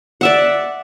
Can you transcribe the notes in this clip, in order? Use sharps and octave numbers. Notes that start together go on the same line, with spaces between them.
D5 E5 F#5